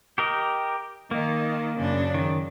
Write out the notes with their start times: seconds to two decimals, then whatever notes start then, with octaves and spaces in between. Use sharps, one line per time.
0.18 G4 A#4 D#5
1.11 D#3 A#3
1.78 F#2 C#3 D4
2.14 D#3